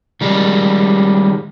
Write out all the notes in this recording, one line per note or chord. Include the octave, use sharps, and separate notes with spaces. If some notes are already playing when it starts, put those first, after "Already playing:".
D#3 G3 G#3